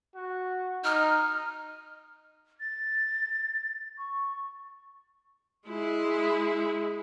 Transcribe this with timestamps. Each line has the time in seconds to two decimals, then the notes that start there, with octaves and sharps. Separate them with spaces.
0.15 F#4
0.84 D#4 F6
2.60 A6
3.98 C#6
5.68 G#3 E4